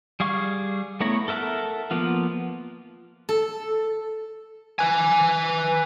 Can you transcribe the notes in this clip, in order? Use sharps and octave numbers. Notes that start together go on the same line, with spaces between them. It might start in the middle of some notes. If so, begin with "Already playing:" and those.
G3 G#4 F5 C#6
A3 B3 E4 C#5 A#5
A4 A#4 E5 F#5 A5
F3 A#3 B3 F4
A4
B4 G#5